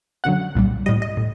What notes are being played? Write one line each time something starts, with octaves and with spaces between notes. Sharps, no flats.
F#2 D3 F#3 F#5
C2 A#2 G3
A2 G3 D#5
D#5
A2